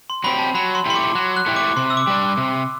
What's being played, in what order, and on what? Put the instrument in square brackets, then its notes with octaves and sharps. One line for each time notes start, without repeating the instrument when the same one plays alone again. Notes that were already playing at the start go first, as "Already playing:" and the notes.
[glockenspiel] C6
[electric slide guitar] F#3 C4 G4 [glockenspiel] B5
[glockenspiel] A5
[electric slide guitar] F#3 [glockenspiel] B5
[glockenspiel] C6
[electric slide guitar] A3 E4 G4 [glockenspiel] C6
[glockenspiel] D6
[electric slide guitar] F#3 [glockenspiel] F#6
[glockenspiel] F#6
[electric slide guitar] A3 E4 G4
[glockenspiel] D6
[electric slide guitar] C3 [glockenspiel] C6
[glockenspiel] E6
D6
[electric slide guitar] G3 D4
C3